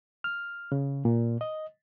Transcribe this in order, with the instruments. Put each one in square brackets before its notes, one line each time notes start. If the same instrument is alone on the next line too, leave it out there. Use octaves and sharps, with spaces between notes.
[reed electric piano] F6
C#3
A#2
D#5